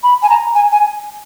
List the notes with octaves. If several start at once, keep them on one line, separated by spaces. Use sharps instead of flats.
B5
G#5
A#5
G#5
G#5